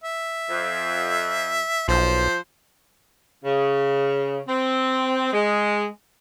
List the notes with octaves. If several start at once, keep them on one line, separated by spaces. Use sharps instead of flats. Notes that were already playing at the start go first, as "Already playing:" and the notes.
E5
F2
B1 F3 C5
C#3
C4
G#3